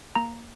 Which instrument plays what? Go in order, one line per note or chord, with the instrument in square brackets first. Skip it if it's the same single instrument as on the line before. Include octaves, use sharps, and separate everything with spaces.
[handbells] A#3 A#5